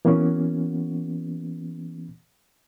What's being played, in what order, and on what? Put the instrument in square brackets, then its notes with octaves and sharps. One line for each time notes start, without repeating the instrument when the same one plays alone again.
[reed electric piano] E3 A#3 B3 C#4 F#4